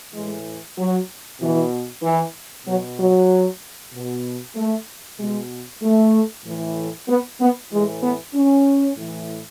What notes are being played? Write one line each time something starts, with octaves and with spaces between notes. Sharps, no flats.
A2 E3 G#3
F#3
B2 E3
E3
B2 F#3
F#3
B2
A3
B2 G#3
A3
A2 E3
B3
B3
A2 E3 G#3
B3
C#4
A2 E3